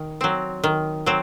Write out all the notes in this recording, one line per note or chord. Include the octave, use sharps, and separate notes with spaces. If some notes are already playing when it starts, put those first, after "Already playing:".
Already playing: D#3
F#3 C4
D#3
F#3 C4